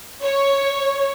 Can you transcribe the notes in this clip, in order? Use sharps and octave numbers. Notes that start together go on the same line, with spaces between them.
C#5